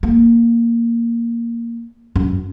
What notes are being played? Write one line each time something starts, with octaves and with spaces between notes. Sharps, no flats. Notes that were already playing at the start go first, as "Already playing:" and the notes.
A#3
F#2